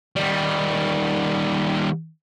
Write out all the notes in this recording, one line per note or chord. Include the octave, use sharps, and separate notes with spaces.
D#3 G3